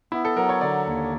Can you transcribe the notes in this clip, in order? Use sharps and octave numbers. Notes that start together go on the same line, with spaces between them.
B3 E4
A4
F#3 A#4
C#5
D3 D5
D#2